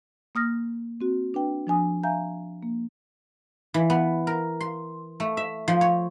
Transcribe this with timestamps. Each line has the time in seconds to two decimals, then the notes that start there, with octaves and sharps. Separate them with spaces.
0.35 A#3 D#6 F6 A#6
1.01 C4 F#4
1.34 D4 B4 G5
1.67 F3 D4 G#5 D#6
2.03 E5 F5 G#5 A#5 G6
2.63 A#3
3.74 E3
3.90 B3
4.27 A#4
4.61 C6
5.20 A3
5.37 E5
5.68 F3
5.81 C#5